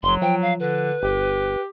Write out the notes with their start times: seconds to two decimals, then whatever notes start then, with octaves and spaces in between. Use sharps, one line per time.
0.03 F#1 F#3 C6
0.22 F3 G5
0.42 F5
0.60 D3 B4
1.03 G1 G4